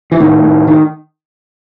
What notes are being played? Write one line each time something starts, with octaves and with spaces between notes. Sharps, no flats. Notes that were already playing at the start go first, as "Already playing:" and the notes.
E3
A2 D#3
A2
D#3